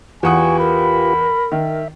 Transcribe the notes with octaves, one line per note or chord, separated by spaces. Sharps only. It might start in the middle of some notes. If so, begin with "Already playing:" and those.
E2 F4 G4 B4 F#5 G#5 C#6 D#6
A#4 B5
D#3 E5